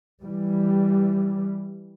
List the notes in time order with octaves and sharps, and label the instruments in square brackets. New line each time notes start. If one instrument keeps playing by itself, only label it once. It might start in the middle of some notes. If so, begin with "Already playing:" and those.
[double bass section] E3 G3